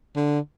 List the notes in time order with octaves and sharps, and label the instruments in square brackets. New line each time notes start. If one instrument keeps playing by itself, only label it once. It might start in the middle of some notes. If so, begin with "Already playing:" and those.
[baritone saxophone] D3